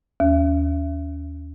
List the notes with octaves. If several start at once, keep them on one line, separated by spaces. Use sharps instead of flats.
D#2